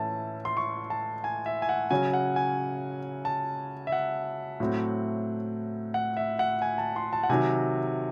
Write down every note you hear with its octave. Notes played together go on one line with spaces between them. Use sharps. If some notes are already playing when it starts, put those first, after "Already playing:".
Already playing: A2 E3 A3 C#4 A5
C6
C#6
A5
G#5
E5
G#5
F#5
C#3 F#3 C#4 G#5
F#5
G#5
A5
E5
F#5
A2 F#3 A3 C4
F#5
E5
F#5
G#5
A5
C6
A5
F#5
C3 D#3 F#3 G#5